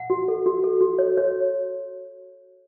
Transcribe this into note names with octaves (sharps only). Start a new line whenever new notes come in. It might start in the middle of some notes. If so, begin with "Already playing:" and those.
Already playing: F#5
F#4
A4
F#4
A4
F#4
C#5
C#5